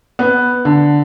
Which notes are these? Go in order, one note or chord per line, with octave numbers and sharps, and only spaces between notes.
B3
D3